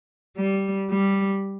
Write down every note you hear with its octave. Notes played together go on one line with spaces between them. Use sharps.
G3
G3